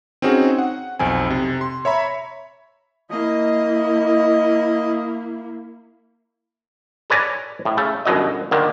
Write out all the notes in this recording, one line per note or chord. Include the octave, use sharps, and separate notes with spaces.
C4 C#4 D#4 F#4 G#4
F#5
B1 F2 C4 G#5
C3
C6
C#5 E5 A#5 B5
A#3 E4 D#5
A4 B4 C#5 D5 G#5 A#5
A2
C#3 A3 A4
G1 F#2 B2 F#3 D#5
A#2 D3 D#3